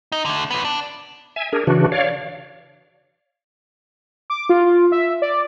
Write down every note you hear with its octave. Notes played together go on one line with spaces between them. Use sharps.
D#4
D3 A3
A#2 B3
D4
E5 G#5
D4 G#4 A#4
C#3 E3 D4 F#4
C#5 D5 F5
D6
F4
E5
D5